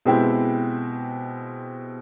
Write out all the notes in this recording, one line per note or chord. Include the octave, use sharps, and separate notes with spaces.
B2 G#3 C4 E4 G4